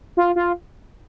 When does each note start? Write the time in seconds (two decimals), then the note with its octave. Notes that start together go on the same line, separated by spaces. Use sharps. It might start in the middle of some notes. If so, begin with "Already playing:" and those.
0.17 F4
0.36 F4